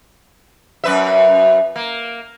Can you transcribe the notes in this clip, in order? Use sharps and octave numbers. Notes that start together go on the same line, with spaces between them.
F#2 B4 E5
A#3